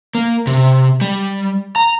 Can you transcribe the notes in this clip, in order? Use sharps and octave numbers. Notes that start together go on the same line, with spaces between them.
A#3
C3
G3
A#5